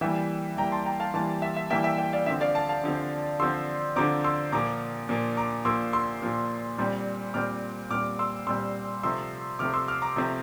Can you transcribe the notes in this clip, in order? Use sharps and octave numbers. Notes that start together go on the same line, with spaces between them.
E3 G3 A#3 E5 G5
E3 G3 A#3 G5 A#5
A5 C6
G5 A#5
F5 A5
E3 G3 A#3 F5 A5
E5
E5
E3 G3 A#3 E5 G5
E5 G5
E5 G5
D5 F5
D3 F3 C4 E5
D5 F5
F5 A5
F5 A5
D3 F3 C4
D3 F3 C4 C6 E6
D3 F3 C4 A#5 D6
C6 E6
A#2 F3 A#3 A#5 D6
A#2 F3 A#3
A#5 D6
A#2 F3 A#3 C6 E6
C6 E6
A#2 F3 A#3
A#2 G3 C4
A#2 G3 C4 D6 F6
A#2 G3 C4 D6 F6
C6 E6
A#2 G3 C4 C6 E6
C3 F3 A3 C4 C6 E6
C3 F3 A3 C4 D6 F6
C6 E6
D6 F6
A#5 D6
C3 F3 A3 C4